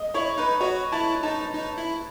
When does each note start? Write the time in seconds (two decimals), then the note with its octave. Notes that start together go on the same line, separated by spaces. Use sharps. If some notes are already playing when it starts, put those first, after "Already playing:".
Already playing: D#5
0.14 E4 C#5
0.38 D#4 B4
0.60 F#4 C#5
0.92 E4 A5
1.23 D#4 A5
1.54 D#4
1.78 E4